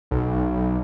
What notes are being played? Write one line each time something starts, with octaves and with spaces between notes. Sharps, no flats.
B1